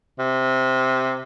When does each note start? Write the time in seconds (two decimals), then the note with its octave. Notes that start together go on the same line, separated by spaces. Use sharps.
0.19 C3